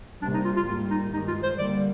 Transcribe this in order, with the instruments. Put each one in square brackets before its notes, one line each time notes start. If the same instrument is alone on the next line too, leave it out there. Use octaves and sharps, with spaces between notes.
[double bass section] C3 G3 A#3 [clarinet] D4
[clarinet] D#4
F4
F4
[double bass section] G#2 G3 A#3 [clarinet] F4
[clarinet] D#4
[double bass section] G2 D#3 G#3 [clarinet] D#4
[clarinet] F4
C5
[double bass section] D3 G3 A#3 [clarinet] D5